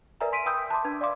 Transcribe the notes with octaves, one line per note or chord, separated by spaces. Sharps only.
A#4 B4 D5 E5 G#5 A#5
G#5 C6 B6 D7 D#7
E5 G5 B5 D#6 E6 G6
A5 B5 C6 D6
D4 B4 G#6
D5 E5 F5 C6 D6